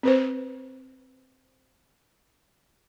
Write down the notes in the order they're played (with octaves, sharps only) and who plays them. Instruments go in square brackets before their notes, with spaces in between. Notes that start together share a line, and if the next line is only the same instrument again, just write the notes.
[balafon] C4 B4 C5